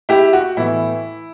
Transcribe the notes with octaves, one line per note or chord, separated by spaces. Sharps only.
E4 G4
F#4
A2 E3 B3 E4